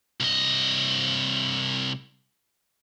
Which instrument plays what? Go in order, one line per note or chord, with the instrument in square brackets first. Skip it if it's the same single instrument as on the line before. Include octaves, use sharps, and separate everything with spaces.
[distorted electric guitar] C2 D#5